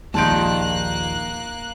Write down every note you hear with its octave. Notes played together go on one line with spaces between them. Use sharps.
A#1 D#2 D#3 A#3 F4 A5 F#6 D7